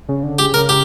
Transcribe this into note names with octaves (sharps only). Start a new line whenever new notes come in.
C#3
D3
C#3 G4
A#4
G4